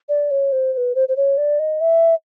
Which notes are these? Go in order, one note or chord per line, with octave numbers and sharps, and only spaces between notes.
D5
C#5
C5
C5
B4
C5
C5
C#5
D5
D#5
E5